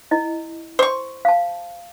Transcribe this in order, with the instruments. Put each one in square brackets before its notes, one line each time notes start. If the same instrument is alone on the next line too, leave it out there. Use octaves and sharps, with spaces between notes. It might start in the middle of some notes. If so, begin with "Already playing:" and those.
[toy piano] E4 D#5
[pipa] C5 C#6
[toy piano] F5 A5